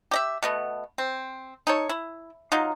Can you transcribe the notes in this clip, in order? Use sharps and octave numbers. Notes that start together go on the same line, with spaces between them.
G4 D#5 E5
B2 A3 B3
C4
D#4 A4 C#5
E4
F#3 D#4 F4